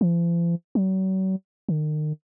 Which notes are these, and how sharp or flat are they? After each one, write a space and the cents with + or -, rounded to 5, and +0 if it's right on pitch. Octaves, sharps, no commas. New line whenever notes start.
F3 -45
F#3 +40
D#3 -35